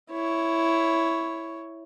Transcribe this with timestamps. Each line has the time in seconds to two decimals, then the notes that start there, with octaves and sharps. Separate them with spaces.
0.12 E4 C#5